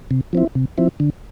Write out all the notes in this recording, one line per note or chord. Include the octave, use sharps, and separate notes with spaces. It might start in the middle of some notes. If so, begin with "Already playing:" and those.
C3
F3 C4 E4
C3
F3 C4 E4
D3